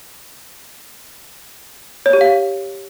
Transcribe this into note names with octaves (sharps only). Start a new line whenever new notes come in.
C#5
G4
F5